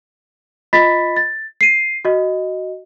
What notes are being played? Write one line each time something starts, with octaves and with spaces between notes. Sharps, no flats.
F4 D#5 B5 A6 B6
A6
C7 D#7
F#4 D#5